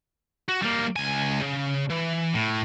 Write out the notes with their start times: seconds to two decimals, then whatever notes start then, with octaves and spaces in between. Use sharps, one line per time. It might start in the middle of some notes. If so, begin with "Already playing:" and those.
0.49 F#4
0.62 G3 A#3
0.96 C#2 G#5
1.42 C#3
1.90 E3
2.34 A2